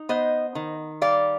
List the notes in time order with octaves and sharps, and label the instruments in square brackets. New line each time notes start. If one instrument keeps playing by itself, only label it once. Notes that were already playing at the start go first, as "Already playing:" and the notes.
Already playing: [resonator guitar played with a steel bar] D#4
B3 C5 D#5
D#3
G3 D5 F5